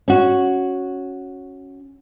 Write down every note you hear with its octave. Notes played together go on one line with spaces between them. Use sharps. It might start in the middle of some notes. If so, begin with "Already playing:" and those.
C#4 F#4